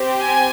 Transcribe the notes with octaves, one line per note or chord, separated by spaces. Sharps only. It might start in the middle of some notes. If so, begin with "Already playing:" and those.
Already playing: C4 G4
G#5